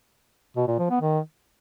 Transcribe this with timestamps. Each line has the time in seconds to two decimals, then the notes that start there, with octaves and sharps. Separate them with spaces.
0.56 B2
0.67 A#2
0.79 F3
0.90 B3
1.01 D#3